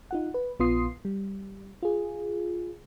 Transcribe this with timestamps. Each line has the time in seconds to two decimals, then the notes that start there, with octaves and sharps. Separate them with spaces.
0.11 D#4 F4 F#5
0.34 B4
0.59 A#1 B3 F4 C6 D#6 C7
1.05 G3
1.83 F4 G#4